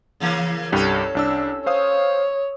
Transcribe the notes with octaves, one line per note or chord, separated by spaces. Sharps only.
C#3 E3 A#3
C2 G2 C#4 G4 A4
C2 D4 E6
C5 C#5 F5 D#6